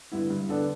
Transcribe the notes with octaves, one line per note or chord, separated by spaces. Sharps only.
G2 D3 B3 E4
G2
D3 B3 D4 A4